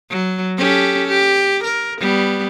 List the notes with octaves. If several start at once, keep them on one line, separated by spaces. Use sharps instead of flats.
F#3
C#4 G4 A4
G4
A#4
G3 B3